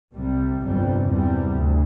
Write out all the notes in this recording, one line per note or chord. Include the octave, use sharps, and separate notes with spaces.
C2 C3 G3
G1 F2 C3 G3
E2 C3 G3
D2